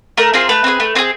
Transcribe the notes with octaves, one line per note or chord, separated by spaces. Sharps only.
A3 A#4
C4 F4 G#4 A#4
A3 B4
C4 F4 G#4
A3
C4 F4 G#4